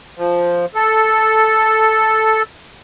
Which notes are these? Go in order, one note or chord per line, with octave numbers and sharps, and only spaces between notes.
F3
A4